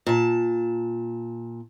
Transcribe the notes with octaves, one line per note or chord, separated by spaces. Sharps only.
A#2 A5